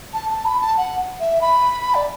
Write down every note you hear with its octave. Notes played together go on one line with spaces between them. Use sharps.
A5
A5
B5
A5
F#5
E5
B5
D5